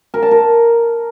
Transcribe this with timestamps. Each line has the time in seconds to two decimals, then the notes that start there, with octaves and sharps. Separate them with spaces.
0.14 A#4
0.22 A5
0.31 A#4